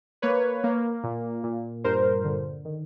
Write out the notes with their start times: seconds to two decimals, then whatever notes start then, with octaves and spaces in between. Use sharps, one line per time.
0.22 A#3 B4 C#5
0.64 A#3
1.04 A#2
1.44 A#2
1.84 G2 A#4 C5
2.24 D3
2.65 D#3